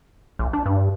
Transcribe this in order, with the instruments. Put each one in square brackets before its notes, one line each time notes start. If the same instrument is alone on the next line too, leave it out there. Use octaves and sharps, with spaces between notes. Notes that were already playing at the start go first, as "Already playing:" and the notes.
[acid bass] A#1
D4
G2